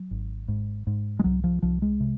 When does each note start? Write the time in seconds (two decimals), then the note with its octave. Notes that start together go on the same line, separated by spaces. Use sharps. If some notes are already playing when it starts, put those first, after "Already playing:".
Already playing: F#3
0.11 G#1
0.48 G#2
0.87 G#2
1.19 G#3
1.24 C2 F#3
1.44 F3
1.62 C2 F3
1.82 G#3
2.00 C3